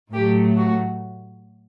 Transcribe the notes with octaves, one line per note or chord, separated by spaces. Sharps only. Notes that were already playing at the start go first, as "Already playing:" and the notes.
A2 F#3 A3 G4
F#4